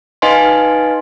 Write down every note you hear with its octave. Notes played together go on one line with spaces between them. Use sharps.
D#4 B4 D#5 F5 G#5 C6